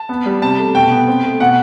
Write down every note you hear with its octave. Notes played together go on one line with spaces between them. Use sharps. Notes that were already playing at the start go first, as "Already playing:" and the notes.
Already playing: A5
B3
G3
C3 A5
A3
B2 G5
B3
C4
A3
B2 F#5